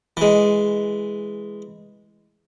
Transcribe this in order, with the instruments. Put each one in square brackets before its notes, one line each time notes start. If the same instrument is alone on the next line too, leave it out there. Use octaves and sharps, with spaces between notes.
[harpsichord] E3 G#3